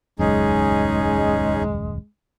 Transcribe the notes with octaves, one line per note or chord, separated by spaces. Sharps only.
D#1 C#2 F#2 G#3 C#4 D#4 G#4